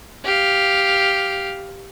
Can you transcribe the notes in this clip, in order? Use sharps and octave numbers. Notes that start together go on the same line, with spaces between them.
G4 F5